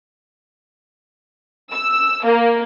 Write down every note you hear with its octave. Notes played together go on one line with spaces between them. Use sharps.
E6
A#3